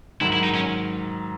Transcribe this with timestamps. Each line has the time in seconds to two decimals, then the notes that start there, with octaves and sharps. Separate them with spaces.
0.21 G#2 D#3 F#3 E4
0.33 E4
0.43 D#4
0.54 C#4